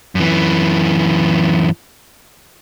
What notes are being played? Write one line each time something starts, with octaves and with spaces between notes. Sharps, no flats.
F#2 E3